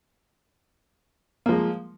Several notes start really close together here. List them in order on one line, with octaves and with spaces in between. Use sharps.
A#3 F3 G#3